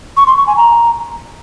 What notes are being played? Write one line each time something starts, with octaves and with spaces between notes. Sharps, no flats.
C#6
C6
C#6
G#5
A#5